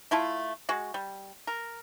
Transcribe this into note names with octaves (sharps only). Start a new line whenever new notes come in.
A3 E4 F4 A5
G#3 F#4
G3
A#4